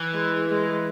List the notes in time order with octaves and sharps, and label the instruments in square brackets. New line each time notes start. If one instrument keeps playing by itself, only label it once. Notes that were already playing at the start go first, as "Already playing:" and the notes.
Already playing: [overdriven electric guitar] E3
[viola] G#3
G#3